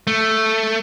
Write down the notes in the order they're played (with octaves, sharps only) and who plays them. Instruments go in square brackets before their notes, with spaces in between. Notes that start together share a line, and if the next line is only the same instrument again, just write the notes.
[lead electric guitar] A3